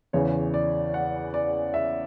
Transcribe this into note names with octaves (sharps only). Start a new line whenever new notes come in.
E2 C#3 E3 C#5
D5
F#5
D5
E5